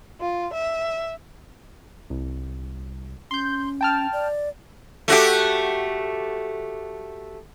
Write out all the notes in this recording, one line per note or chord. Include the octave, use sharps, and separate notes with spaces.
F4
E5
C2
C#4 C6 G6
G5 A5 F6
D5
A3 F#4 G4